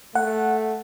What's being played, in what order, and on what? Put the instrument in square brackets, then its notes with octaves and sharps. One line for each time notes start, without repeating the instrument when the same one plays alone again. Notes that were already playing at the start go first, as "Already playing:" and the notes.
[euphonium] A3 [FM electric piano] F#5